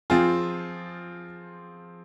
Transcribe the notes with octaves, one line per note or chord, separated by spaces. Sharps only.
F3 C4 F4 G#4